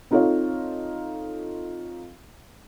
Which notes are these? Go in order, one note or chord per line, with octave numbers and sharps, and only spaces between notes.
C4 D#4 F4 A4 C#5 F5